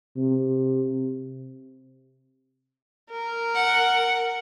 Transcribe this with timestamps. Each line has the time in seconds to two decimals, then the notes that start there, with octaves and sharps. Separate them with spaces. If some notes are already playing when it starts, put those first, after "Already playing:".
0.16 C3
3.11 A#4
3.55 F#5